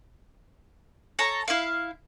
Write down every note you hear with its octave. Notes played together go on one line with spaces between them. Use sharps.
A4 C#5 A#5
E4 F5